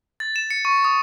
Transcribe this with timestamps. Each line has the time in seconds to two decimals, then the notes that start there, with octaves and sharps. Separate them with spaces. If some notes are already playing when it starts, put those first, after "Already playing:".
0.20 A6
0.36 E7
0.51 C#7
0.65 C#6
0.84 D#6